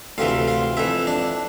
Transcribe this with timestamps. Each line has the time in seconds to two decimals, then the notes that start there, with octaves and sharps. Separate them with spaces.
0.18 D2 C3 E3 F4
0.48 F4
0.77 F2 E3 E4
1.07 D4